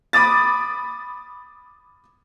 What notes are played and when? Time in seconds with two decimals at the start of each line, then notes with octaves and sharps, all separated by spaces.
0.13 B5 D6 D#6 A6